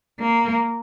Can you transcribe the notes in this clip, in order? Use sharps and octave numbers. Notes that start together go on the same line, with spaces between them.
A#3